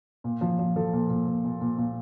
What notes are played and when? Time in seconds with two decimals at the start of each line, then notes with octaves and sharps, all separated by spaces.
0.24 A#2
0.41 F3
0.59 F3
0.76 F3 A4
0.93 A#2
1.10 A#2
1.27 A#2
1.45 A#2
1.61 A#2
1.78 A#2